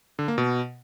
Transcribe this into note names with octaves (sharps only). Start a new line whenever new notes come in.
D3
A#3
B2